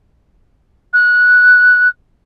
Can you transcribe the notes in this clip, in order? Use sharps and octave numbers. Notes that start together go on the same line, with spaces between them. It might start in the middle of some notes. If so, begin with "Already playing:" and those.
F#6